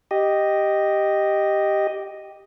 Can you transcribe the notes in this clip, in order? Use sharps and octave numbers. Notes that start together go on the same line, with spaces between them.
G4 D#5